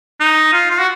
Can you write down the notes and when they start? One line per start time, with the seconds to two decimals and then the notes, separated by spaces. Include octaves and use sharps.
0.20 D#4
0.53 F4
0.70 F4
0.80 F#4